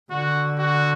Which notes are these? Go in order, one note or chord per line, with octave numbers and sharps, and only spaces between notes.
D3 F#4
F#4